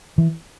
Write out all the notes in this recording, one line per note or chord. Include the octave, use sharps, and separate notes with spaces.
E3